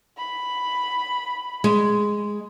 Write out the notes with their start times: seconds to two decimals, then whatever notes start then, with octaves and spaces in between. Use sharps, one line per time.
0.18 B5
1.64 G#3